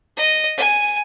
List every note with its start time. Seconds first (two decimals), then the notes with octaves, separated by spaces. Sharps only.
0.17 D#5
0.57 G#5